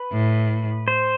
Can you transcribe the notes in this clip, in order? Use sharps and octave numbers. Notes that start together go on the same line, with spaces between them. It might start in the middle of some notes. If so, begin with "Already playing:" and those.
Already playing: B4
A2
C5